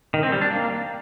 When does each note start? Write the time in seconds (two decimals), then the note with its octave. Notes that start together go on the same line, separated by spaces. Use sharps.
0.14 D#3
0.23 C4
0.32 G3
0.42 D4
0.51 A#3